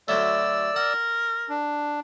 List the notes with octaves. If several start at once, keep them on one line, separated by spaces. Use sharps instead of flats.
D2 F#3 A3 D5 E6
A#4 F#5
D4